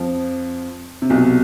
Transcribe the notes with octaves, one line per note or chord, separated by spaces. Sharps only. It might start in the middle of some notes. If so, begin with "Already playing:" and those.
Already playing: F2 F3
C3
B1 B2